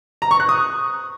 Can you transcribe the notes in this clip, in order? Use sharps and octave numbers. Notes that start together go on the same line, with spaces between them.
A#5
C#6
F#6
D#6